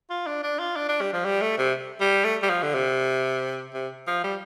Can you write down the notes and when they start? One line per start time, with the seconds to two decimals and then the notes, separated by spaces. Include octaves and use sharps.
0.10 F4
0.26 D4
0.43 D4
0.59 F4
0.76 D4
0.89 D4
1.01 G3
1.13 F3
1.25 G3
1.42 A3
1.58 C3
2.01 G3
2.25 A3
2.43 G3
2.50 F3
2.63 D3
2.74 C3
3.74 C3
4.07 F3
4.24 G3